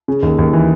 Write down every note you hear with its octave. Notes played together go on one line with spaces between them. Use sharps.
C#3
D#2
D#2
E3